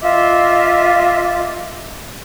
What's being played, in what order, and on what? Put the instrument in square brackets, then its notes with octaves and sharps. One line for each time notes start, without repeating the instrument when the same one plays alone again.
[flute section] F4 D#5 E5 D6